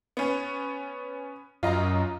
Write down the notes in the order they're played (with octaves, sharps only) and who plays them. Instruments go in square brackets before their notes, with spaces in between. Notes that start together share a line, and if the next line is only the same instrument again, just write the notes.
[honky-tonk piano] B3 C#4
[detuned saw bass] F#2 [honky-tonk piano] F4 D#5 A#5